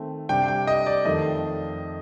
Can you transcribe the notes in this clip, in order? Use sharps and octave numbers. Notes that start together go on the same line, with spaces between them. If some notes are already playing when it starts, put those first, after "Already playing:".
Already playing: D#3 A3 C4
C3 G3 D4 G5
G5
D#5
D5
F2 D#3 A3 D#5